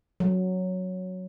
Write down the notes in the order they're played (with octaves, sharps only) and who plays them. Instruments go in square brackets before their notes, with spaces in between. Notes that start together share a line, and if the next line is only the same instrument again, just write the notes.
[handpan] F#3